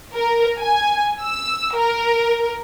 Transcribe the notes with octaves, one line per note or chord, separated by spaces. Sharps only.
A#4
G#5
E6
A#4